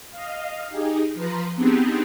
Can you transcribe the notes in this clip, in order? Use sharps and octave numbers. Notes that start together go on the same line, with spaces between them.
D#5 F5
D#4 G4 G#4
F3 B4 A#5 C6
B3 C4 D4 D#4 G4 G#4